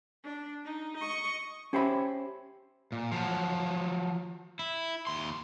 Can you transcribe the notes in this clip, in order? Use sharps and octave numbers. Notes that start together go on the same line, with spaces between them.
D4
D#4
D#5 C#6
C#4 G4 C5 E5 B5
A#2
F3 F#3
E4
D#2 C6